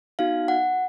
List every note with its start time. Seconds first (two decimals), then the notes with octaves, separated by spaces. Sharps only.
0.19 B3 D#4 F#4 F5
0.48 F#5